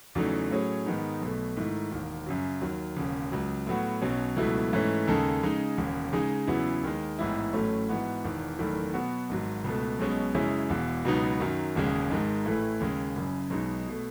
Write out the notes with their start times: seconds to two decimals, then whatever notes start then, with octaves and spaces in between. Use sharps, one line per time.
0.15 E2 C#3 F#3 A3 D#4
0.51 A2 F#3 C#4 G#4 C#5
0.86 G#2 D#3 G#3 B3 D#4
1.21 B1 B2 A3
1.57 G#2 D#3 A3 E4
1.91 E1 D#2 D#3
2.26 F#2 C#3 F#3
2.61 D#2 D#3 F#3
2.97 E1 D#2 C#3
3.32 C#2 C#3 F#3
3.67 A2 F#3 B3 F#4
4.02 B1 B2 F#3 C#4
4.37 C#2 B2 F#3 A3 E4
4.73 G#2 E3 A3 C#4
5.07 D#2 C#3 G#3 D#4 A4
5.43 C#3 G#3 D#4
5.77 E1 D#2 C#3
6.13 C#3 G#3 D#4 G#4
6.47 E2 C#3 F#3 B3 E4
6.83 D#2 D#3 G#3
7.19 A1 G#2 E3 B3 E4
7.53 A1 A2 F#3 A3 C#4
7.89 G#2 E3 B3 F#4
8.24 E1 E2 D#3
8.59 F#1 E2 D#3 A3
8.94 B2 F#3 B3 F#4
9.29 G#1 G#2 F#3
9.64 C#2 B2 A3
9.99 B1 B2 G#3 C#4
10.35 F#2 C#3 G#3 C#4 E4
10.70 E1 E2 B2
11.05 C#2 B2 F#3 B3 D#4
11.40 F#2 D#3 F#3
11.75 E1 D#2 C#3 G#3
12.10 G#1 G#2 D#3 G#3
12.45 A1 A2 E3 A3
12.80 D#2 C#3 G#3
13.16 F#1 F#2 C#3
13.50 B1 B2 G#3 D#4
13.88 B2 A3